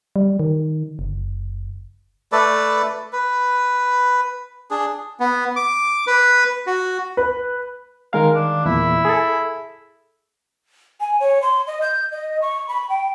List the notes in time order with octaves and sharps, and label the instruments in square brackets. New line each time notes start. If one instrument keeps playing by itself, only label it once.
[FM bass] G3
D#3
F#1
[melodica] A3 A4 B4 D5
B4
D4 G#4
[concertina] B3
D6
B4
F#4
[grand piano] B4
[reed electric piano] D#3 G#3 F5 [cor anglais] A#4
[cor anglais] D4
[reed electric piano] E2 A#2 [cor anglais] E4
[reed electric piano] G#4 A4
[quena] G#5
C#5
C6
D#5
G6
D#5
C#6
B5
G5